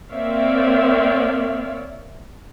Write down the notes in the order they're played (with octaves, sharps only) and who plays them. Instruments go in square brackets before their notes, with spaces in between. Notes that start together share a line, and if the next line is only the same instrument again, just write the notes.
[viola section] A#3 C4 C#5 D5 E5 F5